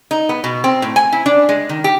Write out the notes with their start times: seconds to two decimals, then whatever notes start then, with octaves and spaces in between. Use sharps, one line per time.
0.11 D#4
0.29 B3
0.44 B2
0.64 C4
0.82 A2
0.96 G#5
1.12 E4
1.26 D4
1.49 G#3
1.69 D#3
1.84 G4